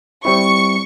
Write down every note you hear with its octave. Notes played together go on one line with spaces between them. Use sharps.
G3 C4 E4 C#6 C#7